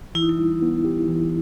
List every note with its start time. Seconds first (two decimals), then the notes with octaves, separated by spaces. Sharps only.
0.15 E3 E4
0.22 D#4
0.29 E4
0.38 G3
0.62 B3
0.85 G4
1.08 E3